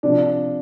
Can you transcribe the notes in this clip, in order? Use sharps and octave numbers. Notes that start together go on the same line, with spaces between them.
C3 F3 D4